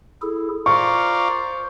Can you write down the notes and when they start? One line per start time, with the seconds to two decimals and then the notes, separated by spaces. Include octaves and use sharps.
0.22 E4 G#4 A4
0.66 F4 A#4 C5 D5 C#6